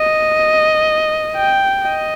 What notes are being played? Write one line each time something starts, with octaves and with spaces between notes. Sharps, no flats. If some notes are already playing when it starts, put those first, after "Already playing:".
Already playing: D#5
G5
D#5